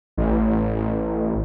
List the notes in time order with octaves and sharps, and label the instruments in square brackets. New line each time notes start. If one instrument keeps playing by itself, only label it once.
[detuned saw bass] A1